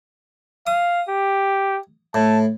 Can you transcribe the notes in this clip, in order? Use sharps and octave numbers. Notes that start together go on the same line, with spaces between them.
F5 D#6
G4
A2 A5